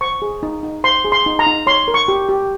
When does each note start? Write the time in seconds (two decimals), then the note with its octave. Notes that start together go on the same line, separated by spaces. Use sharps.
0.01 C5 C#6
0.22 G#4
0.43 D#4
0.63 D#4
0.84 C5 C6
1.05 G#4
1.12 C6
1.26 D#4
1.39 A#5
1.46 D#4
1.67 C#5 C6
1.88 A#4
1.94 C#6
2.08 G4
2.29 G4